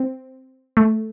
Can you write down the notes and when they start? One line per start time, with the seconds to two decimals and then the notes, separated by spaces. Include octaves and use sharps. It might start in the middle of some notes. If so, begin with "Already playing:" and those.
Already playing: C4
0.77 A3